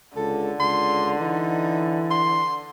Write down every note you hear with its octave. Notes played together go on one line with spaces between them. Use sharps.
C#2 D3 A4
C#2 C6
E3 D#4
C6